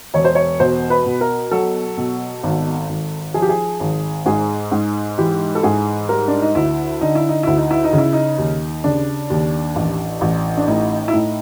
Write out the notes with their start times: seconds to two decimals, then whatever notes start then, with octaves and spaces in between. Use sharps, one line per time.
0.14 E1 C#5
0.25 C5
0.35 C#5
0.60 B2 C5
0.90 B4
1.06 B2
1.21 A#4
1.51 F#3 A4
1.97 B2
2.43 G#1
2.89 G#1
3.34 F3 G#4
3.42 G4
3.49 G#4
3.80 G#1
4.26 G#2 G#4
4.72 G#2
5.18 E3 G4
5.55 A4
5.63 G#2 G#4
6.09 G3 A#4
6.28 D4
6.42 D#4
6.55 D2 E4
7.01 D3 D#4
7.15 E4
7.29 D#4
7.43 D2 E4
7.57 D#4
7.71 E4
7.84 D#4
7.93 C#3
7.98 E4
8.13 D#4
8.38 D#2
8.84 C#3 D4
9.30 D#2
9.76 A1
10.21 A1
10.57 D4
10.67 A2 D#4
11.08 E4
11.13 A2 D#4